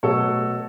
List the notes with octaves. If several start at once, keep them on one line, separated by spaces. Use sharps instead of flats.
B2 F#3 A3 A4 C#5